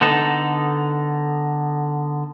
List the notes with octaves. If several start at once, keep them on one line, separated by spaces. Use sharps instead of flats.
D3 B3 D#4 A4